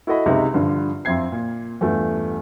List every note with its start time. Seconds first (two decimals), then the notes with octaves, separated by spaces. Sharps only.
0.07 E4 F#4 A4 D#5 B5
0.26 C#2 C3 D#4 G#4 E5
0.54 G2 D3 F3
1.05 F2 C4 E5 G#6 C7
1.32 A#2
1.81 E2 G2 A3 F4